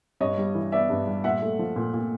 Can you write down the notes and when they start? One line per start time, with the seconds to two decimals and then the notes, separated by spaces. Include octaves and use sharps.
0.20 G2 C#5 D#5
0.38 G3
0.55 E3
0.72 B3 D5 E5
0.90 G2
1.07 G3
1.24 A#2 E5 F#5
1.42 A3
1.59 F3
1.76 A#2
1.94 A#2